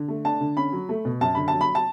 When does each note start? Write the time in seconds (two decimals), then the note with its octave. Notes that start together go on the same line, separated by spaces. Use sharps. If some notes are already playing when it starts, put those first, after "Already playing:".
Already playing: D3
0.08 A3
0.25 D4 A5
0.41 D3
0.57 C#4 B5
0.73 F#3
0.89 A3
1.05 B2
1.21 F#2 A5
1.35 D3 B5
1.48 A5
1.53 F#3
1.61 B5
1.75 A5